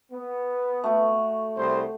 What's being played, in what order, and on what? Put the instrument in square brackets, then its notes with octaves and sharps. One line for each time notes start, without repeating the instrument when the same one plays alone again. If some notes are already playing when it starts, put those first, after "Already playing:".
[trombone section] B3
[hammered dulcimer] A3 F#4
[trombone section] C2 E4 C5